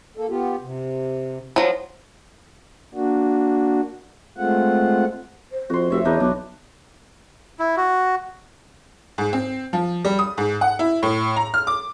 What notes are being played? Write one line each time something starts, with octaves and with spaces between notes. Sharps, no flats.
A#3 A4
B3 F4 G4
C3
F3 F#3
A#3 D4 F#4
G#3 A3 C4 F4 F#5
C5
F2 F#4 C6
F1 F#4 C#5 E5
E2 D4 D#4 B4 C#5
B1 D4
E4
F#4
G#2
C4
F3
G3
D#6
G#2
F#5
E4
A2
A#5
F6
D6